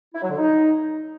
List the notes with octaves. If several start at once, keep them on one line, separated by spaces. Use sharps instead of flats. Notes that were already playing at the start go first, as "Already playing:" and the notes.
E4
F#3
D3
D#4